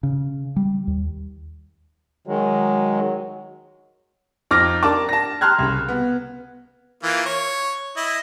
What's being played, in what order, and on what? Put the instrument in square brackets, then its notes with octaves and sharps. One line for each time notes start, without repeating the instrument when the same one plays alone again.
[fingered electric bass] C#3
G3
D#2
[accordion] D#3 G#3 [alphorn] F#3
[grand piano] F2 D#4 D6 F6 A#6
D4 A#4 A5 D6
A5 A#6
A5 A#5 C6 F6 F#6 G#6
C2 C#3
B3
[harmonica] E3 A#3 F4
C#5
E4 D#5